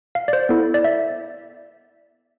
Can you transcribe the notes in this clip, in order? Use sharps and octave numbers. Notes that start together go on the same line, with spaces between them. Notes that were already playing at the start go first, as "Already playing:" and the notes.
F5
D5
C5
B3 E4 A4
D5
E5